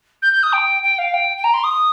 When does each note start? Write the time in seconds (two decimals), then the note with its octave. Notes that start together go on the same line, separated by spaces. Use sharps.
0.22 G6
0.33 G6
0.43 D#6
0.53 G5
0.83 G5
0.99 F5
1.14 G5
1.38 G5
1.44 A#5
1.54 C6
1.64 D#6